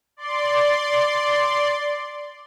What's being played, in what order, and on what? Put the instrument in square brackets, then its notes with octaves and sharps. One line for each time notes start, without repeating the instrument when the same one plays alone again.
[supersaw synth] D5 C6